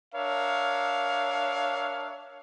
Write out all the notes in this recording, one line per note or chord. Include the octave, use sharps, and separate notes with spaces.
D4 A#4 C#5 E5 F5